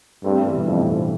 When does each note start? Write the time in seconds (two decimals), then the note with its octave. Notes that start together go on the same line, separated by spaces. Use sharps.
0.24 G2 A3 C4
0.34 G3 B3
0.45 E3 G3
0.56 G2 B2
0.66 F2 A2